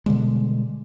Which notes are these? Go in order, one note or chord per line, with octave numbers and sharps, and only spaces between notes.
B2 D3 G3 G#3